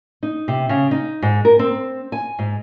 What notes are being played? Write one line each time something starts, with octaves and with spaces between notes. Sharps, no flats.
D#4
C3
C#3
D#4
G#2
A#4
C4
G#5
G#2